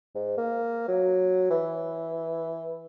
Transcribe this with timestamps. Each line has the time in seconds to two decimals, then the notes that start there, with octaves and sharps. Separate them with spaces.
0.15 G#2
0.38 A#3
0.88 F#3
1.50 E3